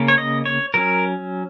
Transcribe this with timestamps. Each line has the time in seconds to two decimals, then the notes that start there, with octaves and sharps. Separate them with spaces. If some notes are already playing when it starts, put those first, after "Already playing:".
Already playing: C#3 A#3 C#4
0.08 C#5
0.18 D#5
0.46 C#5
0.74 F#3 C#4 A#4